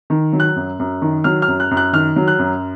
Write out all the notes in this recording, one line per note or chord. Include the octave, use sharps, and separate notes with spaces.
D#3
F#3
F#6
F#2
F#2
D#3
F#3 F6
F6
F#2
F#6
F#2
F#6
D#3 F6
F#3
F#6
F#2